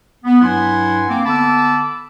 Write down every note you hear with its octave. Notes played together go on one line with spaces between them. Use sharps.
B3
G2 F#3 E4 F#5 G#5 C6
A#3 C4 D6
D3 B3 A5 B5 D6 E6